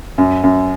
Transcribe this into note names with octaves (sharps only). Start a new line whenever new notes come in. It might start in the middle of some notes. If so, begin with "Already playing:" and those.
F#2
F#2